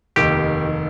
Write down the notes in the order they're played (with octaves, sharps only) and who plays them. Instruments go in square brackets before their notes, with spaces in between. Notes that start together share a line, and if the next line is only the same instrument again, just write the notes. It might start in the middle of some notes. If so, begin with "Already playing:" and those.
[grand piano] F1 D#2 D#3 [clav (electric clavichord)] G4